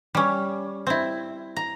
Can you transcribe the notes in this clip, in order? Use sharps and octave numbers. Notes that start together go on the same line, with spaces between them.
G3 C#4
C4 E4
A#5